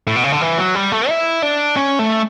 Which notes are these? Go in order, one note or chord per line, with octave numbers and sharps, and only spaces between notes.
A2
B2
C#3
D3
E3
F#3
G3
A3
E4
D4
C#4
A3